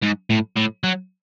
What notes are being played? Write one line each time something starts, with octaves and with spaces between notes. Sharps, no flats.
G#2
A2
A2
F#3